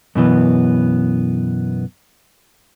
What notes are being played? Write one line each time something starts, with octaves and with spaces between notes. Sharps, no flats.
F#2 B2 E3 B3